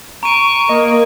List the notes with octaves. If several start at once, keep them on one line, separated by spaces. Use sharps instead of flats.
A#5 C#6 D7 D#7
A#3 D#5